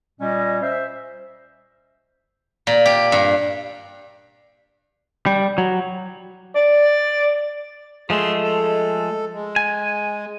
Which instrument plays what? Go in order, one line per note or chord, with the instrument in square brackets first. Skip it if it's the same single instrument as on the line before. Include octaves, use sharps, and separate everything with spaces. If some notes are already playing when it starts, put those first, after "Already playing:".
[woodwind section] A#2 G3 C#4 D#5
C5 E5
[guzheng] A#2
G4
G2
[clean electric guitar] G3
F#3
[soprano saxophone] D5
[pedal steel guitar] F3 G#3 A3 [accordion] G#4 C6
[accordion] A4
G#3
[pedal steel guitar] G#5